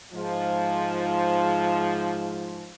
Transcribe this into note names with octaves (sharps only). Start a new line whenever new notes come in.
G#2 F3